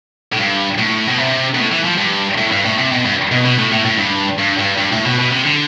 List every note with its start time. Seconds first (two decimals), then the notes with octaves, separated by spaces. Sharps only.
0.32 A2
0.38 G2
0.78 A2
1.08 B2
1.19 C3
1.55 B2
1.58 A2
1.72 E3
1.85 F3
1.98 G2
2.38 A2
2.52 G2
2.65 A2
2.78 C3
2.92 B2
3.05 G2
3.32 B2
3.45 B2
3.58 A2
3.72 A2
3.85 A2
3.98 G2
4.38 G2
4.58 G2
4.78 G2
4.92 A2
5.05 B2
5.19 B2
5.32 C3
5.45 D3